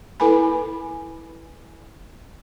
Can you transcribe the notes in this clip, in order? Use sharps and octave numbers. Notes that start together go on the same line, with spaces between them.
E4 A4 B4 G#5 B5